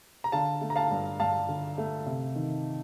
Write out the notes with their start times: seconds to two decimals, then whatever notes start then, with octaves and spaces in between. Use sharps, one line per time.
0.24 A#5
0.32 D3 F5 A5
0.61 A3
0.70 A#5
0.76 F5 A5
0.91 G2
1.19 G2 F5 A5
1.49 D3
1.78 A3
2.06 C3
2.35 D#3